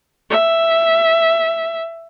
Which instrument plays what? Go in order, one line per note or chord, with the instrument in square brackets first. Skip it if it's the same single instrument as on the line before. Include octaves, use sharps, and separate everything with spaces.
[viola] E5